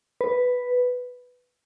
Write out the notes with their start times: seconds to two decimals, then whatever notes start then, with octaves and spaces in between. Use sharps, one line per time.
0.21 B4